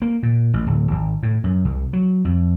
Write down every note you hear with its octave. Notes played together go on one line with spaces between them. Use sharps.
A#3
A#2
A1
D1
G#1
A2
F#2
C2
F#3
F2